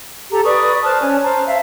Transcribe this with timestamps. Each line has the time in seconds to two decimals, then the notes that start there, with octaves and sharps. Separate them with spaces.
0.31 G4 A4 A#5
0.44 B4 D5 C#6 D#6
0.83 C5 A5 F6 F#6
1.00 C#4 G#5
1.22 C5 A5 A#5
1.47 E5 F5